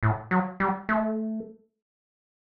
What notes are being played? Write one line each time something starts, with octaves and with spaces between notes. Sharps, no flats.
A2
F#3
G3
A3